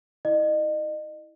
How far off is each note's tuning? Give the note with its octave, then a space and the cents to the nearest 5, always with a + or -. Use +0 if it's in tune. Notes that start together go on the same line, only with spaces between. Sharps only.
E4 -25 D#5 -35